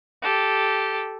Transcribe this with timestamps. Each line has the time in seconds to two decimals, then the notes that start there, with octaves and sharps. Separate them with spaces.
0.22 G4 A4